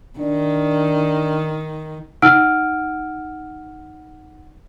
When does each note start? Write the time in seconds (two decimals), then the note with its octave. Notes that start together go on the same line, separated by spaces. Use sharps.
0.19 D#3 D4
2.22 D#4 F#5 E6 F6 D7